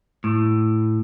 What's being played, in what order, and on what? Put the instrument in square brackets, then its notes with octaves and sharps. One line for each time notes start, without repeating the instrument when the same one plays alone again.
[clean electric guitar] A2